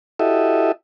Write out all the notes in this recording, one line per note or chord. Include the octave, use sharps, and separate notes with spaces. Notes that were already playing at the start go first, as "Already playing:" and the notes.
E4 F#4 G4 A4 D#5 E5